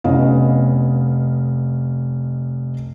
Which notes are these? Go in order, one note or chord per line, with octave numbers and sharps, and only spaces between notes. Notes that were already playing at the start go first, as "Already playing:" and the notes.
F1 B3 C#4 D#5 F5